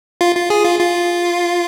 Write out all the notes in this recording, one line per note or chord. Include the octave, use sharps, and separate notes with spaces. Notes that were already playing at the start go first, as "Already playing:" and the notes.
F4
F4
G#4
F4
F4